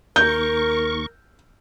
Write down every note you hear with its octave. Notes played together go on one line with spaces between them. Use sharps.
D#2 A#4 C#6 G6